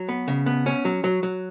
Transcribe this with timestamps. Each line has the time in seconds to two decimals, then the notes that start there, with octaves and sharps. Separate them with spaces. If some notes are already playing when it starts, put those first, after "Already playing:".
Already playing: F#3
0.09 B3
0.28 C#3
0.46 B3
0.66 C#4
0.85 F#3
1.04 F#3
1.23 F#3